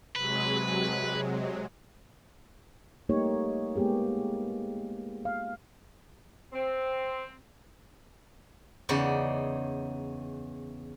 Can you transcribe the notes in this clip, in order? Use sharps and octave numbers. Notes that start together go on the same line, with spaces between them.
C3 F#3 G#3 B4
G3 A3 A#3 D#4 G4 C#5
G#3 A#3 B3 G4 G#4
F5
C4
E2 C#3 D#4 D5